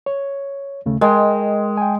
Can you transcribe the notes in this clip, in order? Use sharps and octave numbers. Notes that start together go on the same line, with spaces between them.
C#5
D#2 C#3 A3
G#3 A#4 D#5 G5
G5 G#5